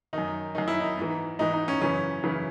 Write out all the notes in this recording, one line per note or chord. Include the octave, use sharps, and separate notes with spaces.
F#2 D#3 D#4
F#2 D#3 D#4
E4
D#4
G#2 E3
G#2 E3 D#4
D#4
C#4
F#2 C#3 E3 C#4
F#2 C#3 E3